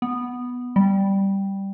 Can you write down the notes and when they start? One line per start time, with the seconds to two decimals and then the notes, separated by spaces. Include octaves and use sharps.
0.02 B3
0.76 G3